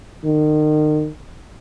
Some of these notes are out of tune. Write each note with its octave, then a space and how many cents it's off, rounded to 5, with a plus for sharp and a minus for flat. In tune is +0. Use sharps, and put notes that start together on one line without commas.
D#3 -35